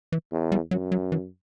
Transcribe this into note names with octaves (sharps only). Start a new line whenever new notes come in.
E3
E2
G3
F#2 F#3
F#3
E3